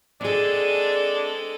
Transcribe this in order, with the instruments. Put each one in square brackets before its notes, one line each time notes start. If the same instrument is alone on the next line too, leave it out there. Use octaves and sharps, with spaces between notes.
[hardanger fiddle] G#3 A4 [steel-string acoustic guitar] C4 G#4 [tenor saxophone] D4